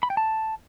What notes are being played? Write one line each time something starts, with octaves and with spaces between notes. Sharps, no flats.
B5
G5
A5